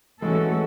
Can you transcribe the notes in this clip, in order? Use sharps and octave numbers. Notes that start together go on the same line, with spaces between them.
E3 G#3 A3 C#4 F#4 A4